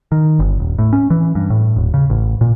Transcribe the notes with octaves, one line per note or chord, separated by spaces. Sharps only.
D#3
G1
D#1
A2
C#4
E3
G2
A2
D#1
C#3
A1
A#2